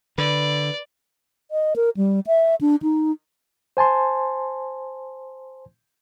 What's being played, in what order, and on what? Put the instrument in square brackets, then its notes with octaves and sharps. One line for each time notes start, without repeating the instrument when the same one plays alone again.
[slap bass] D3 [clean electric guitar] B4 [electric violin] D5
[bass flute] D#5
A#4
G3
E5
D4
D#4
[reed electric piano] C5 G#5 A5 C6